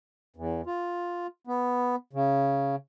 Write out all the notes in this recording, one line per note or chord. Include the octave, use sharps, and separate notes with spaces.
E2
F4
B3
C#3